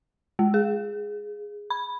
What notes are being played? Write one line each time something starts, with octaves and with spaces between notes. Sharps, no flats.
G#3
G#4
B5